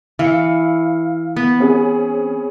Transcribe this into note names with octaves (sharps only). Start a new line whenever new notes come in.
E3 F5 C#7
B3
C4 C#4 G#4